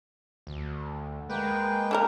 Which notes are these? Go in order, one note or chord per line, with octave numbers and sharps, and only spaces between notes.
D2
G#3 A#3 B4 G5
D4 A4 A#4